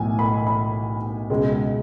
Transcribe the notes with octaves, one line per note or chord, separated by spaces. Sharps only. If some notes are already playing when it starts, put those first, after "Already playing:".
Already playing: B1 A2 E3 G#5
B5
B5
C#2 B2 G#3